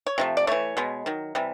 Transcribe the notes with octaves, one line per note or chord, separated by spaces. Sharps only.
C#5
C3 F3 A3
D5
E3 A3 C#5
B2 G#3 B3
D#3 F#3
C3 E3 G3